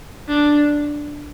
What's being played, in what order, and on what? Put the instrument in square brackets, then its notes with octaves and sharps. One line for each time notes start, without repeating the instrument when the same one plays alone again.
[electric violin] D4